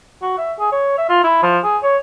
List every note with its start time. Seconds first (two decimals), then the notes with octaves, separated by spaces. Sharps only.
0.22 F#4
0.38 E5
0.60 G#4
0.72 C#5
0.98 E5
1.09 F4
1.24 E4
1.43 F3
1.64 G#4
1.83 C#5